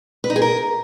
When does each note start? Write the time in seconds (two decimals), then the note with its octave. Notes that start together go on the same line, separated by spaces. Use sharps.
0.24 B4
0.30 D#4
0.36 G#4
0.42 A#4